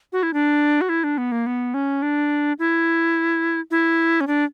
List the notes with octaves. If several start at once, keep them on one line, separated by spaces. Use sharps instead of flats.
F#4
E4
D4
F#4
E4
D4
B3
A#3
B3
C#4
D4
E4
E4
C#4
D4